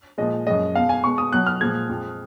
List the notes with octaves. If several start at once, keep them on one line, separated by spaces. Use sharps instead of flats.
A#2 F3 G#3 D#5
F#2 F3 G#3 D#5
B2 G#3 F5
G#5
B2 G#3 C#6
D#6
B2 F#3 F#6
F6
A#2 F3 G#3 G#6
F2 F3 G#3